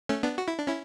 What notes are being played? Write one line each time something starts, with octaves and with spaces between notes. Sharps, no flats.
A3 C#4
B3 D4
F#4
E4
D4
C#4 E4